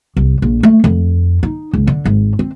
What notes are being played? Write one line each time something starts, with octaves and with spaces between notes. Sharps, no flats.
C2
A#1
A3
F2
D#4
C#2
D3
G#1
C4